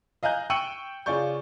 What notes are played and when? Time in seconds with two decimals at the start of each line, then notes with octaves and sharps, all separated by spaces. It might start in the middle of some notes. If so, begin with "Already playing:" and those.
0.23 D#5 F5 G#5 A#5 F#6 G6
0.50 G5 C#6 E6 C#7 D#7 F#7
1.06 C#3 F4 D5 G#5 C#6 G6